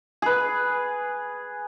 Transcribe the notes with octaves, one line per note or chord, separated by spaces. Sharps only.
G#4 B4